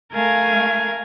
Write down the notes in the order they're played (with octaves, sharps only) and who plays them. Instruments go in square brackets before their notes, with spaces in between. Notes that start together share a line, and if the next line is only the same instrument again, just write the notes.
[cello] A3 F5 [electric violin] A#4 G#5